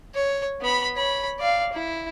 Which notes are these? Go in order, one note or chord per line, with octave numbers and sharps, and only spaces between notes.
C#5
B3 B5
C#5 B5
D5 F5
E4